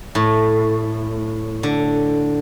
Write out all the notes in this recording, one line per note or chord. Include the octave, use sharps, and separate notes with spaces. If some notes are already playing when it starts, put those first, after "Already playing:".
A2
D3